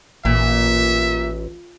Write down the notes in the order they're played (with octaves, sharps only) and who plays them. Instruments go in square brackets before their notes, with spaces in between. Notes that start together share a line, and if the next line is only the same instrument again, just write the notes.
[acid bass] A1 [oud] A#2 [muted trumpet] E5